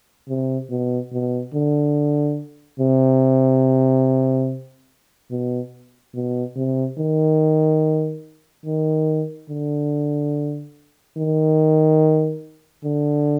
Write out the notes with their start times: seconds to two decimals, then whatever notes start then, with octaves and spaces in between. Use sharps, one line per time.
0.28 C3
0.70 B2
1.13 B2
1.54 D3
2.80 C3
5.31 B2
6.15 B2
6.56 C3
6.98 D#3
8.65 D#3
9.49 D3
11.17 D#3
12.84 D3